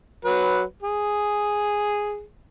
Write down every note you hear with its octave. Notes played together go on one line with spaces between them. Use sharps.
F#3 B4
G#4